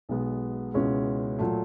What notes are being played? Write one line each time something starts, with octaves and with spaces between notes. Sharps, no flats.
B1 B2 G#3 B3
C#2 B2 G#3 C#4 E4
A#2 F#3 A3